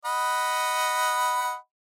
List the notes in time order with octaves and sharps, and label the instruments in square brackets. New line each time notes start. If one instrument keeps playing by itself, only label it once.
[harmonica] D#5 F#5 B5